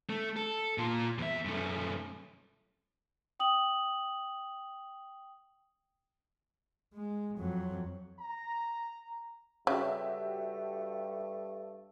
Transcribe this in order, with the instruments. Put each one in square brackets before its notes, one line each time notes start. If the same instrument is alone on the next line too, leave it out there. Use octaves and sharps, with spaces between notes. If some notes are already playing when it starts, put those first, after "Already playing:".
[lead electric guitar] A3
A4
A#2 F4
E2 E5
F#2 A3
[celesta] G5 D#6 F#7
[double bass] G#3
F2 F#3
[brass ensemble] A#5
[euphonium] G2 [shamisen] C#3 [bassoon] A3 [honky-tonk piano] F#4 G4 E5